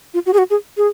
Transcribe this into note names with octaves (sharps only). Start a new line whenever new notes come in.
F4
F#4
G#4
F#4
G#4
G#4